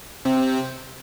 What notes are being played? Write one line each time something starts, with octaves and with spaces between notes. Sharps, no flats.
C3 C4